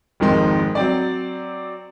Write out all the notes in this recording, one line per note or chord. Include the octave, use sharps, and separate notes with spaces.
G#1 F2 D#3 G#3 C6
F#3 C4 D5